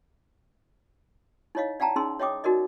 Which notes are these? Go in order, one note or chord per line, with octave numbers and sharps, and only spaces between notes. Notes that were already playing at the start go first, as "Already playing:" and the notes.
D#4 E4 C#5 D#5 F5
D5 F5 G5 A5 A#5
C#4 D#4 G#4 C6 E6
C#5 D#5 E5 G5 D6 D#6
D#4 F#4 A#4 D5 D#5